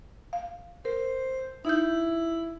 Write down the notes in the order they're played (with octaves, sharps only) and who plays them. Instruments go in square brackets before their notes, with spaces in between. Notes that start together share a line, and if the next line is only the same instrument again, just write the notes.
[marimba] F5
[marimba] A#4 [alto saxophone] C5
[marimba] D#4 G6 [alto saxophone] E4